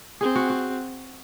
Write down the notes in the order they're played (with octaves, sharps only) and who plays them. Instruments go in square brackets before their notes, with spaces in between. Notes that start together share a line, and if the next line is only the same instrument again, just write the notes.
[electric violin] C4 [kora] G#4
[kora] F#4
F#4